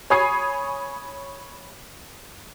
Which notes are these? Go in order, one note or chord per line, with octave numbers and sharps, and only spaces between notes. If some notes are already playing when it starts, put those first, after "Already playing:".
C#5 G#5 B5 D#6 G#6 C7